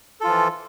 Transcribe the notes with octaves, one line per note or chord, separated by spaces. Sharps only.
E3 F3 F4 A4